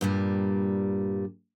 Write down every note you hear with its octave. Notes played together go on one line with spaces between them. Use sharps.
G2 A#2 G3